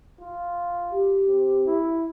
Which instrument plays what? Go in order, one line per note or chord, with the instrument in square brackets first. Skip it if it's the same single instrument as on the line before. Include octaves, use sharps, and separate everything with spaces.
[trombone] F4
[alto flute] G4
[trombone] C4
E4